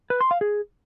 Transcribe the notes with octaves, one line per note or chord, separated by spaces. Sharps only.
B4
C6
F5
G#4